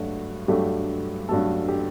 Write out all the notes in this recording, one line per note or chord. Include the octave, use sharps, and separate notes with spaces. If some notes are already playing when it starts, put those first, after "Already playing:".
Already playing: G2 F#3 A3 F#4
G2 F#3 A3 G4
G2 F#3 A3 A4
G4